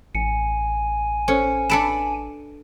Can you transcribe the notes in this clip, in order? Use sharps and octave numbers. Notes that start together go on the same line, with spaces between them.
A1 G#5 C#7
C#4 A4 C5 C#7
D4 A4 B4 C#7 D7 E7